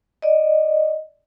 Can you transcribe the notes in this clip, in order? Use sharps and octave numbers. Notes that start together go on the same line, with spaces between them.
D5 D#5